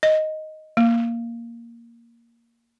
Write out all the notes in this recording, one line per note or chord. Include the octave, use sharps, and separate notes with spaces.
D#5
A#3